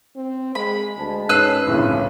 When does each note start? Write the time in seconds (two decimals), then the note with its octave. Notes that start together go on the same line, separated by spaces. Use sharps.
0.16 C4
0.55 G#3 B5
0.97 D2 G#3 A5
1.29 G#2 C#4 B4 E6 F#6 C7
1.67 G1 C2 F2 A2 C#3